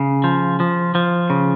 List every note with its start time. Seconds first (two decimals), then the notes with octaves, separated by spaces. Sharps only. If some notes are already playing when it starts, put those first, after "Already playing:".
Already playing: C#3
0.24 F3
0.60 F3
0.95 F3
1.30 C#3